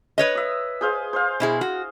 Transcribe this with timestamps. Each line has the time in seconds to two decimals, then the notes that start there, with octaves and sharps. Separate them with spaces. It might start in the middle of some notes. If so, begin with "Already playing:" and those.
0.18 B4 C#5 D#5
0.35 E5 D#6
0.81 G#4 C5 F5
1.13 C5 F5
1.40 B2 E4 G#4
1.61 F#4